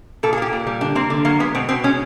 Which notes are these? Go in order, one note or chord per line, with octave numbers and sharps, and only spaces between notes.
A#2 A4
G#4
A#3 G4
A#2
G3
D3 D4
A#3 C4
D3
F#3 A#3
G#3 B3
B2 C4
B2 C4
G#3 C#4